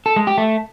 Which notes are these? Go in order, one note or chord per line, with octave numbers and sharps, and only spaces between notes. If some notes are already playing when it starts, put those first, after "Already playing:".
A4
G#3
G4
A3